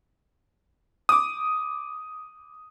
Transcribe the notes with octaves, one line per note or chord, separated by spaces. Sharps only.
D6 D#6